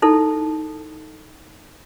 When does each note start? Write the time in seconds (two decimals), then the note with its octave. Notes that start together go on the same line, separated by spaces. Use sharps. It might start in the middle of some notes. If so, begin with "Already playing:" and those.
0.02 D#4 E4 A4